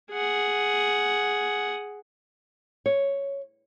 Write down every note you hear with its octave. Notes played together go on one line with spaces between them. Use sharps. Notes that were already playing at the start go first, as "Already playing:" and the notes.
G#4 F#5
C#5